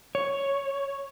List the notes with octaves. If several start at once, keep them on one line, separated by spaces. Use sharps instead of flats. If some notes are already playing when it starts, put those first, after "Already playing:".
C#5